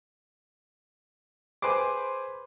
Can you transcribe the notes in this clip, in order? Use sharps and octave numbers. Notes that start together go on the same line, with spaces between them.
G#4 B4 C5 C6 D6